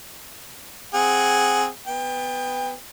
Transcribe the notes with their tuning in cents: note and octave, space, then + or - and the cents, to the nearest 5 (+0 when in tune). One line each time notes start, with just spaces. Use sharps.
C4 +0 G#4 +0 F#5 +0
B3 +10 G5 +30